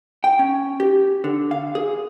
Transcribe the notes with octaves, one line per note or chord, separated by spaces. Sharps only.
G5
C#4
G4
D3
F5
G#4